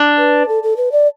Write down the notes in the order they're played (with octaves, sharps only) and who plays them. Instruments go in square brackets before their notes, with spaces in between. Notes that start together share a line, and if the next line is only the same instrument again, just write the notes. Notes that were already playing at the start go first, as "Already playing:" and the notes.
Already playing: [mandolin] D4
[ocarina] B4
A4
A4
B4
D5